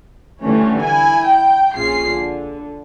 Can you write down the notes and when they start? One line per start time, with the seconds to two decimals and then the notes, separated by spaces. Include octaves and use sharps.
0.42 D3 E3 G3 A3 C#4
0.81 E4 G#5
1.26 G5
1.75 A#1 C#4 F4 G#4 C7
2.09 D3